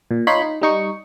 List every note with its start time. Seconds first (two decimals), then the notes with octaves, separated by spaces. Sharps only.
0.11 A#2
0.27 D#4 F4 C#5 B5 C6
0.42 D#4
0.62 G3 D#4 C#6